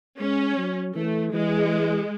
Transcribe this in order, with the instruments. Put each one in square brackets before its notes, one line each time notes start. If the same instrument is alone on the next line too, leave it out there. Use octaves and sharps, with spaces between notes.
[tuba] G#3 [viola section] C#4
[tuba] F#3
[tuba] E3 [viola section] A3
[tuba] E3 [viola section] G#3